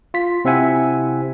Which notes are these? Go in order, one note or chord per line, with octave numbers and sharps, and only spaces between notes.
F4 B6
C3 C4 E4 E5 F#5 G#5